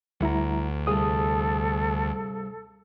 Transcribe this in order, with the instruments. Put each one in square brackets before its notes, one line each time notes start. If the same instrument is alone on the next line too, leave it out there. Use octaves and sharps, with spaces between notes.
[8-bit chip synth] D2 [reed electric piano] G3 E4 A#5 [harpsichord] F#5
[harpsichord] C2 G2 [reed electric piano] G#4 D#6 [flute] A4